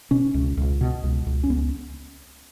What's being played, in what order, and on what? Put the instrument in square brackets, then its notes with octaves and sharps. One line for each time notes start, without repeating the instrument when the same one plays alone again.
[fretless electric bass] B2 C#4
C#2
C#2
B2
C#2
C#2
C#4
C#2 B3